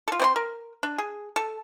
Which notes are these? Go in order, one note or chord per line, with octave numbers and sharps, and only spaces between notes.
F4 A4
C4 C5 C6
A#4
D4
G#4
A4